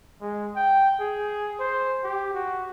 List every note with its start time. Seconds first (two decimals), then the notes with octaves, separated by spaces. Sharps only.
0.21 G#3
0.56 G5
1.00 G#4
1.60 C5
2.04 G4
2.34 F#4